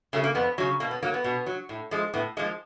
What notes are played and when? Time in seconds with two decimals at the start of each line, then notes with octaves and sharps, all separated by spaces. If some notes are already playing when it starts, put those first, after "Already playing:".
0.13 C#3 F#3 A3
0.24 A#3
0.35 F2 B3
0.58 C#3 F#3
0.80 B2 A#3
0.91 B3
1.02 F#3 A#3
1.14 B3
1.24 B2
1.46 F#3
1.69 A2
1.91 F3 G#3
2.14 A2 B3
2.37 F3 G#3 A#3